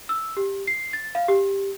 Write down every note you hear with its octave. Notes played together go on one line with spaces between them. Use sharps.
E6
G4
C7
A6
F5
G4